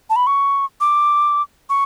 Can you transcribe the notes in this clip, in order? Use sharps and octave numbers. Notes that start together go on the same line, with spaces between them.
A5
B5
C#6
D6
C#6